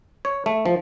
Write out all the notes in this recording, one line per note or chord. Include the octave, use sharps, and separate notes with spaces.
C#5
A3
F3